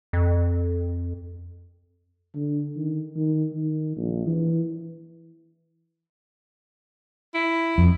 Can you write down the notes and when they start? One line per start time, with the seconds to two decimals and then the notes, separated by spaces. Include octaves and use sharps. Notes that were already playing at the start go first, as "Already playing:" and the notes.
0.13 F2
2.35 D3
2.76 D#3
3.16 D#3
3.53 D#3
3.97 A#1
4.27 E3
7.34 E4
7.78 F2